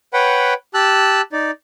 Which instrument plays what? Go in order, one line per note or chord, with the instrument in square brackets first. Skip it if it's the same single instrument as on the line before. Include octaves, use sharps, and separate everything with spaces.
[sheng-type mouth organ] B4 C#5 F#5 G5 B5
G4 A5 E6 F#6
D#4 D5